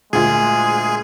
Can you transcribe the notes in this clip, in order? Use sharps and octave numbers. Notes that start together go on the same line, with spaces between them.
D2 A#2 G#3 G#4